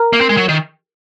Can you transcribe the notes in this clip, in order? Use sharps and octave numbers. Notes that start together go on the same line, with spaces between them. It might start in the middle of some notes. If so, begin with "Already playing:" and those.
Already playing: A#4
A#3
C4
G#3
F#3
D#3